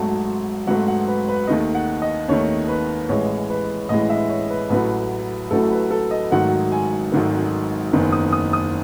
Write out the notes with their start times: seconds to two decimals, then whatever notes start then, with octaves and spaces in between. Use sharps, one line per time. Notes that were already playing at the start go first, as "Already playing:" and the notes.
Already playing: G#1 G#2 F#3 A3 A5
0.67 G#1 G#2 F#3 A3 F#5
0.88 F#5
1.08 B4
1.28 B4
1.47 D#2 D#3 A3 D#5
1.75 F#5
2.02 D#5
2.28 D#2 D#3 A3 C#5
2.68 B4
3.09 A1 A2 E3 G#3 C#5
3.50 B4
3.89 A1 A2 E3 G#3 D#5
4.10 E5
4.29 C#5
4.50 B4
4.70 A1 A2 F#3 A3 B4
5.51 A1 A2 F#3 A3 A4
5.71 B4
5.91 A4
6.11 D#5
6.31 G#1 G#2 D#3 F#3 A3 F#5
6.72 G#5
7.12 G#1 G#2 D#3 F#3 A3
7.93 F#1 E2 D#3
8.12 D#6
8.33 D#6
8.53 D#6